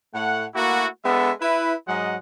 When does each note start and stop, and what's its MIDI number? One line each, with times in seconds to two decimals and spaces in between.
0.13 0.45 45
0.13 0.45 57
0.13 0.45 78
0.55 0.86 57
0.55 0.86 58
0.55 0.86 64
0.55 0.86 66
1.05 1.32 56
1.05 1.32 59
1.05 1.32 62
1.05 1.32 69
1.05 1.32 76
1.40 1.73 64
1.40 1.73 71
1.87 2.16 44
1.87 2.16 54
1.87 2.16 56
1.87 2.16 75
1.87 2.16 78